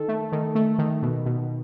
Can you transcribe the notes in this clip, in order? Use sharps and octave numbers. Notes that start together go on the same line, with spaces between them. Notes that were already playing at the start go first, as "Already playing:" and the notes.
Already playing: D#3 A4
A3
D#3
A3
D#3
B2
B2